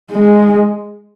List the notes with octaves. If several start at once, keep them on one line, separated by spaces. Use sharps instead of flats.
G#3